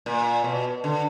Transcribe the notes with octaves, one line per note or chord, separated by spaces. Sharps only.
A#2
B2
D3